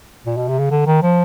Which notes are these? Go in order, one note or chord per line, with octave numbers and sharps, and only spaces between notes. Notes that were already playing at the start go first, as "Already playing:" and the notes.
A#2
B2
C3
C#3
D3
D#3
F3